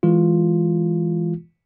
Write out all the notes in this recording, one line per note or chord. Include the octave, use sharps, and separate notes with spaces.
E3 G#3 F4